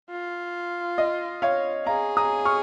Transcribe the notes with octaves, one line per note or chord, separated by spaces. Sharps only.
F4
D#5
C#5 F5
G#4 F5 A#5
A#5 D#6
C#6 F6